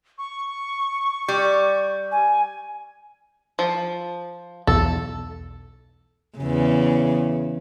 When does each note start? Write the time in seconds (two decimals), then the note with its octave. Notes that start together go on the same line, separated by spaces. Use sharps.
0.18 C#6
1.28 G3
2.11 G#5
3.59 F3
4.67 B1 E2 A4
6.38 E2 C#3